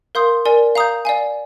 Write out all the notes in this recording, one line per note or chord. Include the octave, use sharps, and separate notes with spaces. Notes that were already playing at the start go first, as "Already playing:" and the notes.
A#4 F5 C6 D#6 G6
A#4 D5 G#5
F5 A#5 D#6 G6
D5 F5 G#5